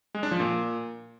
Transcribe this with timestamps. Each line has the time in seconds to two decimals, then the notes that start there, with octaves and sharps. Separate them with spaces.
0.15 G#3
0.23 D4
0.31 F3
0.40 A#2